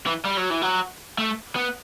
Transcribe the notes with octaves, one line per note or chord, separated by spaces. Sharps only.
E3
G3
F#3
E3
F#3
A3
B3